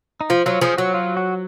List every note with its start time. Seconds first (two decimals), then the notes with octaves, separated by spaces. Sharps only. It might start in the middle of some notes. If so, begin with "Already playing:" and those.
0.21 D#4
0.30 F3 F4
0.46 F#3 F4
0.61 F3 G#4
0.78 F#3 F#4
0.94 F4
1.17 F#4